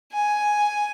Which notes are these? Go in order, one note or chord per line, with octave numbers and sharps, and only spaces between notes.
G#5